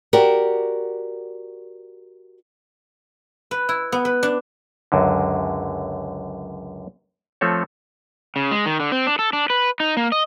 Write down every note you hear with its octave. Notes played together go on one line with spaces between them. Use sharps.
F#4 G4 A#4 D5
B4
E4
B3
B4
D4
C#2 F#2 D3
F3 A3 C4 A4 C#5
C#3
G#3
D#3
D3
C4
D4
A4
D4
B4
D#4
A#3
D#5